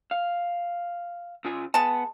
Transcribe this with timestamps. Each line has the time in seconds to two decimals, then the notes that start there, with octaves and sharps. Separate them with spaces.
0.11 F5
1.45 C#3 F4 G#5
1.74 G#3 B3 A5